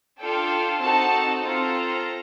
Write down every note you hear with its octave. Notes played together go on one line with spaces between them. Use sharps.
D4 F4 A4 G5
C4 D#4 F#4 A4 A5
C4 F4 A4 A#5